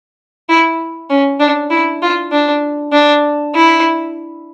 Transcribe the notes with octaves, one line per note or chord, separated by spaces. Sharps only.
E4
C#4
D4
E4
F4
D4
D4
E4